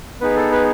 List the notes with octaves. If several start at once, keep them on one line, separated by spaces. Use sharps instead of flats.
B3 D#4 G#4 B4
A4
B4